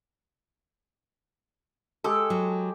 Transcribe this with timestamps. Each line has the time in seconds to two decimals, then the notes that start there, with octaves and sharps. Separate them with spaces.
2.04 G#3 G4 A4
2.30 F#3